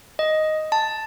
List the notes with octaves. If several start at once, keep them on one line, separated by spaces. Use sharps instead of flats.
D#5
A5